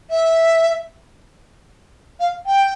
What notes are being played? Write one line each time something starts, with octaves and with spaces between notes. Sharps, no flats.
E5
F5
G5